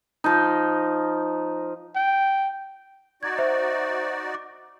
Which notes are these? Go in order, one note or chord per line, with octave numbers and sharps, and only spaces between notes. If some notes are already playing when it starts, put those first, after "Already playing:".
F3 D#4
G5
D#4 F#4 D5 G#6
C5 E5
D6